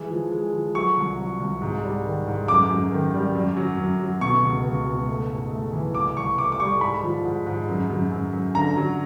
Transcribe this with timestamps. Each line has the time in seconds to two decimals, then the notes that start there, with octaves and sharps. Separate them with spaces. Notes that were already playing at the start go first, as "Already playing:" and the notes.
Already playing: E3 G#3
0.10 F3
0.31 G#3
0.54 F3
0.75 F#3 C#6
0.97 C2
1.18 F#3
1.40 C2
1.62 G#2
1.83 G3
2.05 D#3
2.27 G#2
2.48 F#2 D6
2.70 F#2
2.92 D#3
3.14 G3
3.35 F#2
3.57 F#3
3.78 F#2
4.00 F#3
4.21 B2 C#6
4.43 C#2
4.65 C#2
4.87 B2
5.08 A3
5.30 G#2
5.51 A3
5.73 E3
5.94 C2 D6
6.16 C2 C#6
6.38 C2 D6
6.52 D6
6.60 G3 C#6
6.81 G#2 B5
7.03 F3
7.25 G#2
7.46 G#2
7.68 F#2
7.90 F#2
8.11 F#2
8.33 F#2
8.55 D3 A#5
8.77 F#3